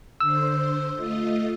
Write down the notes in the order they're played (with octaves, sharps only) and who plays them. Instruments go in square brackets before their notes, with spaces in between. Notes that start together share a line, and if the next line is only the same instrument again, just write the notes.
[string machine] D3 C5 [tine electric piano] E6
[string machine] A3 F4 D#5